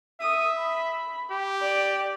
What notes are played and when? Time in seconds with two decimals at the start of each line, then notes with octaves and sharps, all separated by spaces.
0.21 E5 D#6
0.58 B5
1.31 G4
1.62 D5